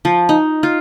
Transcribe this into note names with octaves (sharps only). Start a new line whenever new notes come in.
F3
D#4
F4